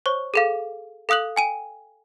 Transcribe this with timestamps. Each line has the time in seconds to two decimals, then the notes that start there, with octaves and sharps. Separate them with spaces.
0.06 C5 C#5 C#6
0.34 G#4 A4 F5
1.09 A4 F5 D#6 F#6 F#7
1.36 G5 G#5 D#7